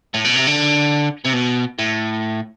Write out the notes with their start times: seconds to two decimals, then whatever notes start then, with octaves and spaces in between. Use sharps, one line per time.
0.14 A2
0.25 B2
0.36 C3
0.47 D3
1.25 C3
1.34 B2
1.79 A2